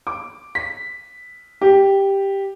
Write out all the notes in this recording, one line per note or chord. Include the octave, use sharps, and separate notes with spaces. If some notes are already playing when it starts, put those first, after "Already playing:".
D6
B6
G4